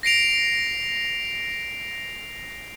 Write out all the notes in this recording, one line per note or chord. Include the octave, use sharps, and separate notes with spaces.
A#6 C7 D7 F7